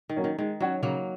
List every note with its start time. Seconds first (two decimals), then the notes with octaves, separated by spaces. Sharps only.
0.09 D#3
0.16 F#3 A#3 C#4
0.24 D#3
0.38 D#3 G#3
0.60 F#3 C#4 F#4 C#5
0.82 C#3 F#3 A#3